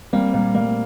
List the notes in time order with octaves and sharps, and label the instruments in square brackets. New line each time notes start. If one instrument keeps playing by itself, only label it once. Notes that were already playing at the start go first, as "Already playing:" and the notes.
[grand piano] G3 A#3 [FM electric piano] C4
[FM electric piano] A#2 [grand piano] G3 A#3
[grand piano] G3 A#3 [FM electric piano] A3